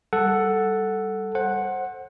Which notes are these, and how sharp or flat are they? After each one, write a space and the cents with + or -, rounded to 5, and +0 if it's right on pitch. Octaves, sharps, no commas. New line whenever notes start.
G3 +0 A4 +0 F#5 +0
C5 +25 F#5 +0